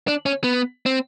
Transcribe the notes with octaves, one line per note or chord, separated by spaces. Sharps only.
D4
C#4
B3
C4